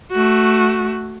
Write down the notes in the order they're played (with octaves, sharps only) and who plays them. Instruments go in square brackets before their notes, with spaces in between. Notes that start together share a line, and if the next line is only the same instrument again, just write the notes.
[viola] A3 F#4